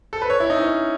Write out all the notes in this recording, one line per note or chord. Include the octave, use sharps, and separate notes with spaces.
A4
B4
C#5
E4
D#4
C#4